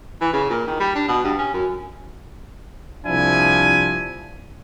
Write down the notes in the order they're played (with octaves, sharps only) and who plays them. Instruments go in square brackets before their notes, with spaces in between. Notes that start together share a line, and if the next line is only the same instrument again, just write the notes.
[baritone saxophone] E3
C#3
A#2
D#3
G3
D4
B2
G2
C#4
F#2
[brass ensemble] C2 F3 D4 E4 G#5